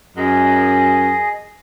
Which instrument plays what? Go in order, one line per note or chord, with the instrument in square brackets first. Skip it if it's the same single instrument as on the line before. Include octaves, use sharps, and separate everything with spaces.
[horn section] F#2 [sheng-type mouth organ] G#4 D#5